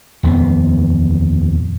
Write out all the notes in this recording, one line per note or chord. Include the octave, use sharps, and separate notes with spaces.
D#1 F2 B3